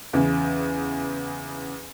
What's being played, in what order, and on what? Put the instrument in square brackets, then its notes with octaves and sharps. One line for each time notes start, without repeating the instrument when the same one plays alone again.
[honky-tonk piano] E2 C#3